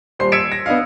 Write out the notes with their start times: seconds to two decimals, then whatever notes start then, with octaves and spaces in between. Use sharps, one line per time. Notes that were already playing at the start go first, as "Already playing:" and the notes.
0.19 D#1 G3 C5 C6 C7
0.32 E6 G#6 B6 C#7 D7 E7
0.52 A#6
0.66 B3 D4 D#5 F5